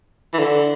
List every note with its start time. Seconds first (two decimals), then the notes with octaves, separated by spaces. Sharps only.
0.33 E3
0.39 D3